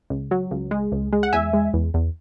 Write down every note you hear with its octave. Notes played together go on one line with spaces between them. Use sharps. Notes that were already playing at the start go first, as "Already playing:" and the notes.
C#2
F#3
C#2
G#3
C#2
G#3
F#5
E2 E5 G#5
G#3
E2
E2